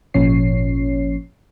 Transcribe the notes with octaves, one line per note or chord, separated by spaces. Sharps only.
G#1 A#2 F3 C#4 C#5 C7